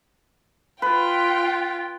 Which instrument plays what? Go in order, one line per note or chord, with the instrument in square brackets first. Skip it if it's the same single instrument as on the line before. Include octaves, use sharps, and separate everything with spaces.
[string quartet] F4 G5 [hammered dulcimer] B4